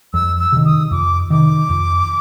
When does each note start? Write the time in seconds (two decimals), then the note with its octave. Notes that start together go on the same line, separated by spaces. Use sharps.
0.14 F2 E6
0.40 E6
0.52 C3 D#3
0.65 D#6
0.91 F2 D6
1.30 C3 D#3 D6
1.70 F2